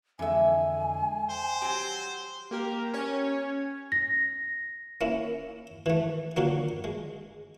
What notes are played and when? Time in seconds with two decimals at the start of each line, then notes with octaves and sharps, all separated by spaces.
0.19 F2 D3 E3 G#3 E5 G#5
1.30 C5 G5
1.62 F#3 C4 G4
2.51 A#3 G4 A#4
2.94 C#4 C#5
3.92 A#6
5.01 A#3 C#4 E4
5.86 E3 A3
6.37 A#2 D3 F#3 A#3
6.84 G#3